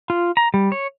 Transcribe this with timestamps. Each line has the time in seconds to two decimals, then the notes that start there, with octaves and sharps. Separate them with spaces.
0.10 F4
0.37 A#5
0.54 G3
0.72 C#5